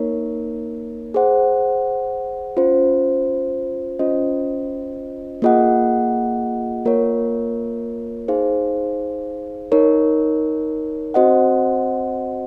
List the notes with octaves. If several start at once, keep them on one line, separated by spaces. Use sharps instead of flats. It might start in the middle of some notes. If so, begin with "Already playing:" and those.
Already playing: A#3 D#4 A#4 C#5
G#4 C5 F#5
C#4 F4 C5
C#4 F4 C5 D#5
A#3 F4 G#4 D#5 F#5
A#3 F4 A#4 C#5
D#4 G#4 C5 F5
D#4 A#4 C#5
C4 F#4 C5 D#5 F#5